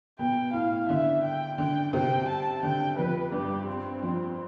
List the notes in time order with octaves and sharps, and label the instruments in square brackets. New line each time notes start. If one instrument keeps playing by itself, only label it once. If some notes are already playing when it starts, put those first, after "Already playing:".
[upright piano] B2 [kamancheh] G5
[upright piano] A2 [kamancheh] F5
[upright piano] D3 [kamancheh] E5
[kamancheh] G5
[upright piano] D3 [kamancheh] G5
[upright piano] C3 [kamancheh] G5
[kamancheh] A5
[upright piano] D3 [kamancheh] G5
[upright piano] F2 [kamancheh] B4
[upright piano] G2 [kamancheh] G4
[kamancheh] C4
[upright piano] F2 [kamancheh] C4